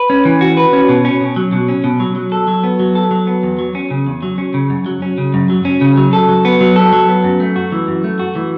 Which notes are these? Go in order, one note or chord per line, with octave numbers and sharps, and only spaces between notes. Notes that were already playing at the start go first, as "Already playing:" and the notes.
Already playing: B4
C#4
E3
F#4
B4
C#4
B2
C#4
B2
F#3
B2
C#4
B2
F#3
F#3
A4
F#3
B3
F#3
A4
F#3
B3
E2
F#3
C#4
C#3
E2
F#3
C#4
C#3
F#2
F#3
C#4
C#3
F#2
F#3
C#4
C#3
F#3
A4
F#3
B3
F#3
A4
F#3
B3
F#2
A3
F#4
E3
F#2
A3
F#4
E3